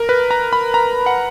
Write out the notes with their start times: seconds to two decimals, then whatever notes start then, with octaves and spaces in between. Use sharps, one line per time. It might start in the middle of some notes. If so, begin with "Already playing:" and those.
Already playing: A#4
0.09 B4
0.31 A#5
0.53 B5
0.74 A#5
1.06 F#5